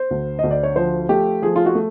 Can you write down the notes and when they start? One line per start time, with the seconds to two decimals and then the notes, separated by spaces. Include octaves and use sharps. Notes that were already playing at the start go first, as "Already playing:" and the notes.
Already playing: C5
0.11 D2
0.39 D2 D#5
0.51 D5
0.63 C#5
0.76 F3 C5
1.09 A3 G4
1.42 F3 G#4
1.56 F4
1.66 F#4
1.75 A3